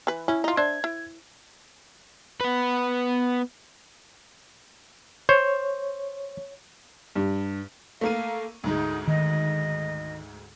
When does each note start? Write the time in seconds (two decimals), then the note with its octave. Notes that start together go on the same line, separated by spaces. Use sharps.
0.07 E3 B4
0.28 C#4 E4
0.44 D#4 F4
0.57 D4 C5 E5 G#6
0.84 E4
2.41 B3 B4
5.29 C5 C#5
7.16 G2
8.01 A3 A#3 F5 D#7
8.64 D2 G#2 G#3 D#4
9.07 D#3 D#5